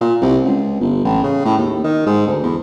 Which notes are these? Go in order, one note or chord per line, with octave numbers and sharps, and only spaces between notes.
A#2
C2
C#2
G1
A1
C#3
A2
D#2
D#3
G#2
D2
E2